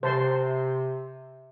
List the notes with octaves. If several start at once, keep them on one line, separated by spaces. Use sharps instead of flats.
C3 C5 A5 C6